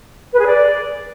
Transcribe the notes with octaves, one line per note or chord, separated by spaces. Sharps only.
B4
G#4
D5